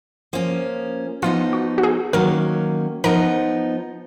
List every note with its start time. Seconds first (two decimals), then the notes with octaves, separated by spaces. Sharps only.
0.33 F3 A#3 C#4
1.22 F3 B3 D#4 F4
1.53 F#4
1.78 F#4
1.83 G#4
2.13 D#3 F#3 A#3 C#4 A#4
3.04 F3 B3 D#4 A#4